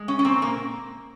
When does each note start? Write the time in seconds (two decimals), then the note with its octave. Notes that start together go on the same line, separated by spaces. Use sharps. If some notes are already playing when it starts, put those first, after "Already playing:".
Already playing: G#3
0.08 C#4
0.19 C#4
0.24 A#2 C4
0.42 A#3